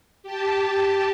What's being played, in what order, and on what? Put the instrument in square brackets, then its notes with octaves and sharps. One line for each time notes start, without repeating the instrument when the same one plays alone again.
[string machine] G4 A5